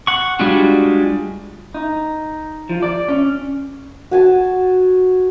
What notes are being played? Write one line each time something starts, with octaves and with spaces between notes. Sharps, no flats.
F#5 C#6
G3 G#3 D4 F4 F#4
D#4
F3
D5
C#4
F#4 G#5 A5